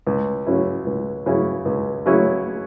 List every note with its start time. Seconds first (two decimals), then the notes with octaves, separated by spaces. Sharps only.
0.07 C#2
0.46 C#3 F#3 C#4 E4
0.86 C#2
1.26 C#3 F#3 C#4 E4
1.65 C#2
2.06 C#3 F#3 C#4 E4